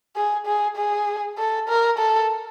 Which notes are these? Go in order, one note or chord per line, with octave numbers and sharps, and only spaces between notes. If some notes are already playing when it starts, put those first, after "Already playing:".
G#4
G#4
G#4
A4
A#4
A4